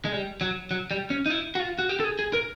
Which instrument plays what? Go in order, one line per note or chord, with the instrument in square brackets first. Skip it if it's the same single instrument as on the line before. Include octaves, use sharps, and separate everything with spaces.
[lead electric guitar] G#3
G3
F#3
F#3
G3
C#4
D#4
E4
F#4
F4
F#4
G4
A4
G#4
G#4
A#4